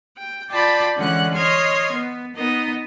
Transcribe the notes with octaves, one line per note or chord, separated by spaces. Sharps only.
G5
F4 D5 G5 A5 B5
D3 E3 G#3 C#4 F#5 F#6
C#5 D#5 C6 F6 G#6
B3
B3 D#4 D#5